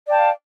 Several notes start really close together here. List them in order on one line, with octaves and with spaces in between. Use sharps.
D5 G5 A5 F5